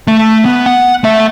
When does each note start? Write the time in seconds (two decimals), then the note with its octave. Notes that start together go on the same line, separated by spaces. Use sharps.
0.07 A3
0.45 B3
0.66 F#5
1.04 A3 E5